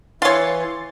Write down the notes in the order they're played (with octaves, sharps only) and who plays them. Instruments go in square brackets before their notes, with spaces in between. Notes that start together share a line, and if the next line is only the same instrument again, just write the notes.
[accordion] E3 [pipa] F4 C#5 [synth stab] C6 A6